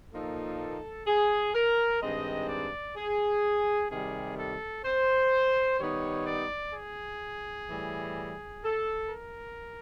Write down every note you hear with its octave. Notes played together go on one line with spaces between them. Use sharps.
A#2 F3 A#3 D#4 A4
G#4
A#4
G2 D#3 G#3 C4 D#4 D#5
D5
G#4
C3 D#3 G3 G#4
A4
C5
D#3 G3 B3 D#4 C#5
D5
G#4
A2 E3 G3
A4
A#4